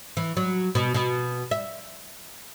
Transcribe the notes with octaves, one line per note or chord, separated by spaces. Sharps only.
E3
F#3
B2
B2
E5